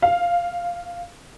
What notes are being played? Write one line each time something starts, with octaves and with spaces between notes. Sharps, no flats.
F5